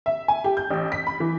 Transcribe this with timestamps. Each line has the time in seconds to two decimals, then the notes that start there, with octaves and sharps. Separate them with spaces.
0.06 E5
0.28 G#5
0.44 G4
0.57 G6
0.70 A1
0.92 B6
1.07 B5
1.20 E3